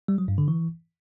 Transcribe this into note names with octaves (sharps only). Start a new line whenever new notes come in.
G3
F#3
G2
D3
E3